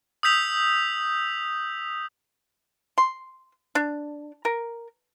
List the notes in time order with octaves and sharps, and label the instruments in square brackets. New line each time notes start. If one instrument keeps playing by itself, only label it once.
[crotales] D#6 E6 G6 B6 F7
[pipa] C6
D4
A#4